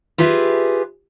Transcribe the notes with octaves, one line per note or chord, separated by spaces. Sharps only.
F4 G4 G#4 B4 E5